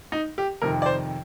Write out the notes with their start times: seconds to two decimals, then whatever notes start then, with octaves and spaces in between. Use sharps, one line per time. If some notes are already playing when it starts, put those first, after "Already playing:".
0.12 D#4
0.38 G4
0.62 F2 C3 D#3 A#4
0.82 D5
0.86 C5